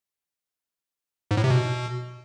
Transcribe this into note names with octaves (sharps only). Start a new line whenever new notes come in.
G#2
A2
C3
B2